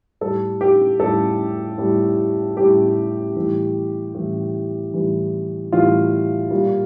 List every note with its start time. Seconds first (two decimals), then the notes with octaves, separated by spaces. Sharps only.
0.21 A2 G3 A4
0.61 G4
1.00 A2 G3 A4
1.78 A2 G3
2.57 A2 G3 G4
3.35 A2 E3 G3
4.15 A2 E3 G3
4.94 A2 E3 G3
5.72 A2 E3 G3 F4
6.51 A#2 G3